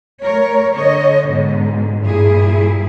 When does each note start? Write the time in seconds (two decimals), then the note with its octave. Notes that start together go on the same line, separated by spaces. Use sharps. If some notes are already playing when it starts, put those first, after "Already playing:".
0.24 A3 A#4 C#5
0.75 D3 C#5 D#5
1.29 G#2 B2 D3
2.00 G2 A#2 E4 G#4